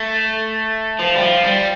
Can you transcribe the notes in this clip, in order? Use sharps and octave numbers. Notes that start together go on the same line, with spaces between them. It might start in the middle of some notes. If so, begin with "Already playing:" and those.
Already playing: A3
F3
G3
F3
G3